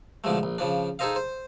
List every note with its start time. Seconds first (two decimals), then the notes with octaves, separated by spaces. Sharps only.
0.24 B1 D3 F3 G#3 A3
0.43 A#1
0.58 C#3 F3 D4
0.99 D#4 G#4 A4 C5 D#5 F5
1.16 C5